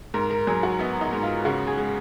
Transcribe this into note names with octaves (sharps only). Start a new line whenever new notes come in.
G#2 A#4
A#4
F#3 G#4
F#4
B3 D#4
D#4
G#2
F4
C#3 F#4
G#4
G#3